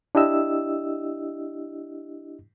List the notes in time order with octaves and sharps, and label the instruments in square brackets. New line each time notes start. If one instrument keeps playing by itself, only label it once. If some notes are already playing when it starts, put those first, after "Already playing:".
[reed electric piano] D4 E4 G4 D#5 E6